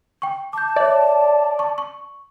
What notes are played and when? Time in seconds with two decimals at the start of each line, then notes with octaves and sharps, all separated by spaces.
0.22 G5 C#6
0.53 A5 D6 G6
0.76 C#5 D5 E5
1.59 C#6
1.78 C#6